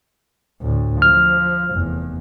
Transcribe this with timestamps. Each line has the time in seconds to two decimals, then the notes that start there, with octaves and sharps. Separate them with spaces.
0.62 D2 A2
1.02 F3 F6
1.71 F1 E2